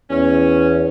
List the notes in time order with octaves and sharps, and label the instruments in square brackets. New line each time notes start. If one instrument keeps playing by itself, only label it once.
[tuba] E2 [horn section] C#4